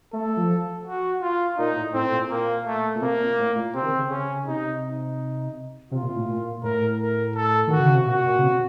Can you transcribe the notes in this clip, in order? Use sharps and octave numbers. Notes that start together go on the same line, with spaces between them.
A3 A4
F3
F#4
F4
A#2 D#4
A2
A2 C4
A#2
A#3
A3
A#2
C3 A#3
A#2
A2
A#2
C3 C4
D#3
C#3
C#3 C#4
C#3
C3 D#4
D#4
C3 F4
A#2
A2
A#2
A2 A#4
A#4
A4
D#3 F#4
C#3
C3
A#2 F#4
A#2
C#3
C3